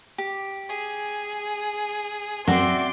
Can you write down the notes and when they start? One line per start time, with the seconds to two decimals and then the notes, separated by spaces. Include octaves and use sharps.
0.18 G4
0.69 G#4
2.48 F#2 C4 F#4 D5 E5 C6 D6